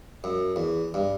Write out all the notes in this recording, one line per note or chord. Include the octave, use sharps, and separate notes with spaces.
F#2
E2
G2